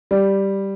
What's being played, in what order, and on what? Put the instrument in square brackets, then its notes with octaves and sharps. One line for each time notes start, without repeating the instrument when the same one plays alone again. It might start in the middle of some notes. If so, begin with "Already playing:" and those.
[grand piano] G3